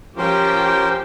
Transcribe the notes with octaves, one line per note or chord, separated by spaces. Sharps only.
F3 C#4 G4 A#4 C5 G5